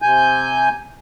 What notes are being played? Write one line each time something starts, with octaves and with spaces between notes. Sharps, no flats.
C3 G#5 G6